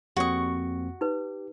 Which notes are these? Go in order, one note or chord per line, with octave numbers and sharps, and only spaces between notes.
F2 A#3 C4 F#4 G4 D5 C#6 D#6
D#4 G4 B4